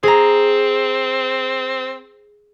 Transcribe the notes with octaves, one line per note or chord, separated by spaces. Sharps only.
C4 G#4 A#5